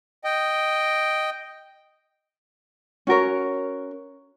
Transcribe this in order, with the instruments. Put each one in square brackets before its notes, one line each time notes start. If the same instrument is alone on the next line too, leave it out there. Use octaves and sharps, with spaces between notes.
[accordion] D#5 G5
[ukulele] C#4 F#4 A#4 C#5